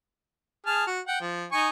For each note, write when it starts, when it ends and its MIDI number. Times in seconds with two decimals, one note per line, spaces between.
0.66 0.84 68
0.66 0.84 81
0.66 0.84 89
0.87 1.00 66
1.08 1.20 78
1.08 1.20 79
1.21 1.46 53
1.52 1.70 63
1.52 1.70 80
1.52 1.70 85